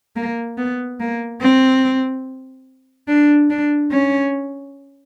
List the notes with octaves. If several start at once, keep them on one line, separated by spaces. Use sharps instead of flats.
A#3
B3
A#3
C4
D4
D4
C#4